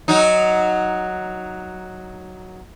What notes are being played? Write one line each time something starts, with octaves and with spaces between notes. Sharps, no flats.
F#3 D#4